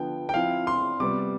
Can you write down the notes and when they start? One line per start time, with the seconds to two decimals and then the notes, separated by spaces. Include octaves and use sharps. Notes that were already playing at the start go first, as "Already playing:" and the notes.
Already playing: D3 F3 B3 G5
0.29 G5
0.34 F3 C4 E4 F5
0.67 C6
1.00 C3 G3 B3 D6